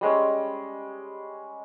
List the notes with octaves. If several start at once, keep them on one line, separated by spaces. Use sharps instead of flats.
G3 G#3 C#4